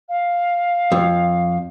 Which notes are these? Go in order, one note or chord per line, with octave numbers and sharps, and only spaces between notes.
F5
F2